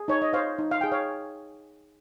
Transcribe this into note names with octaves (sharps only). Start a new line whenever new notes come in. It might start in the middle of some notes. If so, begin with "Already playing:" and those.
Already playing: G#4
D#4 C#5
D#5
C5 C#5 F5
D#4
F5
G#4 G5
C#5 F5